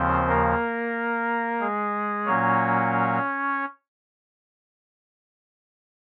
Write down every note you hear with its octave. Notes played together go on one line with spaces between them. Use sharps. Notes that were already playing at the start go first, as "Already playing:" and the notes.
Already playing: D#2 C#3 F3 C4 C5
A#3 A#4
G#3 G#4
A#2 F#3 A#3 C#4 C#5